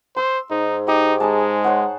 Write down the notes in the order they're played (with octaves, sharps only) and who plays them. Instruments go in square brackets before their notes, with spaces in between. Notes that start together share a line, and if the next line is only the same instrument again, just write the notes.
[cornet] C5 [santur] C6 E6
[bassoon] G#2 [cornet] D#4
[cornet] D#4 [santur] G4
[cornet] G#3 [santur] D#4 G#4 A5
[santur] C5 C#5 F#5